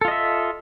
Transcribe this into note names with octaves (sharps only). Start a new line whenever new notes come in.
F4 A4 D#5 E5